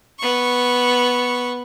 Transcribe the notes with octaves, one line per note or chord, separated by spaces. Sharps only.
B3 C#6